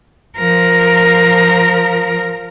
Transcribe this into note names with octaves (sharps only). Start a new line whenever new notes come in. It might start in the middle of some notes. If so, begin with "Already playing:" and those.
F3 A#4